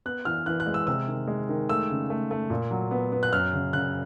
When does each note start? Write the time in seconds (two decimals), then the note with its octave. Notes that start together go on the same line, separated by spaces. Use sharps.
0.06 B3 F#6
0.25 E3 F6
0.46 E3 F#6
0.60 F#6
0.67 G#3
0.74 E6
0.87 C3 E6
1.08 D#3
1.27 G#3
1.49 D#3
1.69 A3 E6
1.90 C#3
2.10 A3
2.31 A3
2.50 A#2
2.71 F#3
2.91 B3
3.12 B3
3.23 F#6
3.32 F#2 F6
3.53 C#3
3.73 C#3 F#6